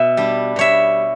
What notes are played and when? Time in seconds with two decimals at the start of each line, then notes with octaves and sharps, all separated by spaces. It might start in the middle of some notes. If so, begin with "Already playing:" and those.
Already playing: B2 E5
0.17 G3 D4
0.56 B2 C#5 E5